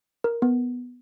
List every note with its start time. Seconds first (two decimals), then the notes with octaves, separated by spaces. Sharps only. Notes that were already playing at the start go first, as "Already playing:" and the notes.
0.24 A#4
0.42 B3